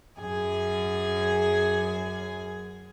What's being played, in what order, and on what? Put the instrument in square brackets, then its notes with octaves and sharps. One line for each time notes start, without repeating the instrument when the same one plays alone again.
[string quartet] F#2 G#4 G#5